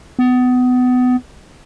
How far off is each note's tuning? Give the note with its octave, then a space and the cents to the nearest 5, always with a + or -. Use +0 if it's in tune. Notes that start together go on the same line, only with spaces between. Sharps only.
B3 +25